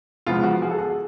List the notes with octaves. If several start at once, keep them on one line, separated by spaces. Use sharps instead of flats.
E2 C#3 F3 G#3 B3 F4
F#4
F#4 G#4
A4
F#4 G#4